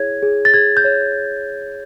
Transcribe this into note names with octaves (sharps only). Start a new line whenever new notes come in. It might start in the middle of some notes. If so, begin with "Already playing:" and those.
Already playing: E4 G#4 C#5 G#6
G#4
A6
G#4 G#6
G6
C#5